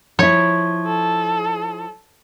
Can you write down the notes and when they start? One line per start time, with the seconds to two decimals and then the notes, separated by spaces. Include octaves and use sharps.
0.19 F3 E4 C#5
0.87 A4